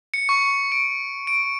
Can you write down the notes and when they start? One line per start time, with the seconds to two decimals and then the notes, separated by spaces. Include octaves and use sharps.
0.14 C#7
0.29 C#6
0.72 D7
1.27 D7